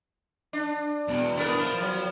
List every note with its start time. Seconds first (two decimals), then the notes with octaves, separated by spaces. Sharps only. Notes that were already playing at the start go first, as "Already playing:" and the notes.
0.53 D4
1.08 E2 B2
1.37 E3 B3 D4 A#4
1.60 F3
1.80 F#3